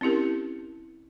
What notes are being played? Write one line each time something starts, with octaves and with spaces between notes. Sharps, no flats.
C4 C#4 E4 G4 A#4